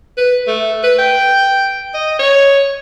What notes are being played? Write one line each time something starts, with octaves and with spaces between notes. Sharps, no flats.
B4
A3
B4
G5
D#5
C#5